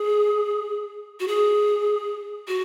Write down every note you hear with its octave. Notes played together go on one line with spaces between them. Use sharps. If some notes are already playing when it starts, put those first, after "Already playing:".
Already playing: G#4
F#4
G#4
F#4